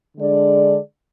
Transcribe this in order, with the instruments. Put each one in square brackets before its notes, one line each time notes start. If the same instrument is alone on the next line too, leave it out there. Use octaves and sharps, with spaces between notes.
[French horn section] D3 G#3 D4 G#4 D5